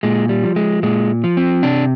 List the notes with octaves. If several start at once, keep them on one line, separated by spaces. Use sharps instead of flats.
A#2 G#3
G3
F3
G#3
A#2 G#3
F3
C4
C3 D4